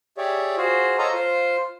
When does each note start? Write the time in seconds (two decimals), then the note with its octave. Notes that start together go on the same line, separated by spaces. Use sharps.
0.17 G4 G#4 C#5 D5 E5
0.57 F4 F#4 G#4 C5
0.98 A4 C5 C#5 D#5 F5 A#5
1.14 F4 C5